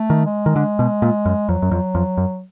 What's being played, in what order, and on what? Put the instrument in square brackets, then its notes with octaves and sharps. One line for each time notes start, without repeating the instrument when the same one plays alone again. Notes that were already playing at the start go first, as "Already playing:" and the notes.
Already playing: [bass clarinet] A3
[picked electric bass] D#3
[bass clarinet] G#3
[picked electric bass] D#3
D3
B2
A#2
F#2
[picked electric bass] F2 [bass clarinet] F#3
[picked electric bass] F#2
F2
F2
F#2